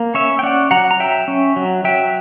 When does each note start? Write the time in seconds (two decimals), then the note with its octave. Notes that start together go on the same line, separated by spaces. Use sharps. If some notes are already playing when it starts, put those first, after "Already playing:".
Already playing: A#3
0.14 C#4 C#5 E5
0.39 G5
0.43 C#4 D5 F#5
0.71 F#3 F#5 A#5
0.91 A#5
1.00 F#3 E5 G5
1.28 C#4
1.56 F#3
1.84 F#3 E5 G5